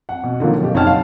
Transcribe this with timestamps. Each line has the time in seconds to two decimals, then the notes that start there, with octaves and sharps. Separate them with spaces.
0.09 F#5
0.24 B2
0.40 D3 D#3 F3 F#3 A#3
0.61 B2 G4
0.74 F#1 D#4 C#5 F#5 A5 F6
0.87 F5